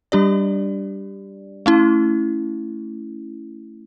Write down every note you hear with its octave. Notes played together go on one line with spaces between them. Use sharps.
G3 D4 G4 D5
A3 C#4 E4